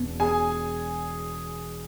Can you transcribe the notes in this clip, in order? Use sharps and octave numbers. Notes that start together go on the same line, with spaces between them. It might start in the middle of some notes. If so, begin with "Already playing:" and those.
Already playing: E1 E2 B2
G#4 G#5